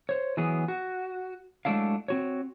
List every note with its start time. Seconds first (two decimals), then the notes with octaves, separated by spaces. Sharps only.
0.09 C5 C#5
0.37 E3 F#3 B3 G#4
0.68 F#4
1.65 F#3 G#3 A3 D4 E4 F5
2.08 C4 F#4 C#5